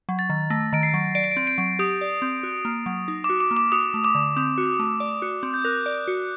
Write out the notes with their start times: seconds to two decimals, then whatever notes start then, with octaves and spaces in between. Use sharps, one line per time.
0.09 F#3
0.19 A6
0.30 D#3
0.50 A3 A#6
0.73 D#3 D7
0.83 C7
0.94 F#3
1.15 D5 D7
1.24 C7
1.32 D7
1.37 C4
1.47 D7
1.58 F#3
1.79 G4 D#6
2.01 D5
2.22 C4
2.43 F#4
2.65 A#3
2.86 F#3
3.08 D#4
3.24 D6
3.29 F#4
3.40 D6
3.51 A#3
3.57 D6
3.72 F#4 D#6
3.94 A3
4.04 D6
4.15 D3
4.37 C4 D#6
4.58 F#4
4.79 A3
5.00 D5
5.22 F#4
5.43 C4
5.54 G6
5.65 A#4 F#6
5.86 D5
6.08 F#4